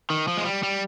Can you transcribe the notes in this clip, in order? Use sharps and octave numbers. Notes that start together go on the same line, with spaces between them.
D#3
F3
G#3
G3
G3